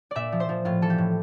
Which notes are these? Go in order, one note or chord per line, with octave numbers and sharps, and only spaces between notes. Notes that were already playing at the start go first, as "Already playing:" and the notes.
A#2 D5 E5
F3
C5
F3
A2 F4
E3 A4
G4
A2